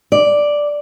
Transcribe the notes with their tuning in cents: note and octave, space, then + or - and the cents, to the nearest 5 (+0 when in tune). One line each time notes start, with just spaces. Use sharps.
D5 +0